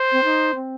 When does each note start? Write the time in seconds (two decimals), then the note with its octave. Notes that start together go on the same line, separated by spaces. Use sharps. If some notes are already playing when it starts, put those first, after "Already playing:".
Already playing: C5
0.12 C4
0.24 D#4
0.55 C4